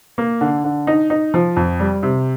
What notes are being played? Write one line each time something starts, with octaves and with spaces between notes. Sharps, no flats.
A#3
D3
D3
D#4
D#4
F3
F2
G3
C3